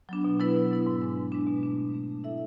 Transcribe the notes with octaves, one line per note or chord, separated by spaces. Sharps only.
F#3 B3 D4
B2
F#3 B3 E4 B4
B2
F#3 B3 E4 B4
G#2
G#3 D4
G#2
G#3 D4
B2
A3 D4
B2
A3 D4
A3
E4 A4 E5